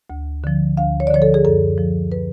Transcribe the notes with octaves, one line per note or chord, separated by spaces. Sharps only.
D2
D3 F3
D2 F5
C#5
D5
D3 F3 C#5
A4
G#4
F#2 A4
F3
B4